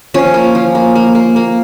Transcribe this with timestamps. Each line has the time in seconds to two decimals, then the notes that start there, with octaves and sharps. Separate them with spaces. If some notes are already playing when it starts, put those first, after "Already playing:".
0.14 F3 C#4
0.34 A#3
0.55 F3
0.75 A#3
0.95 A#3
1.15 A#3
1.36 A#3